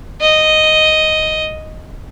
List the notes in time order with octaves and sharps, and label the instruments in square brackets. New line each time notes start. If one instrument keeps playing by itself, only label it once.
[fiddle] D#5